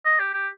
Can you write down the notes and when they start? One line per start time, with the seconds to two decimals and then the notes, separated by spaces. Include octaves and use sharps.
0.05 D#5
0.20 G4
0.33 G4